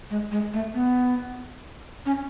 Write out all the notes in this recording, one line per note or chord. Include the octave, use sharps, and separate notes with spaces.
G#3
G#3
A3
B3
C#4